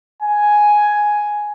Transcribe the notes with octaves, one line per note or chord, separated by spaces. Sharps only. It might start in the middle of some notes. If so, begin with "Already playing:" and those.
G#5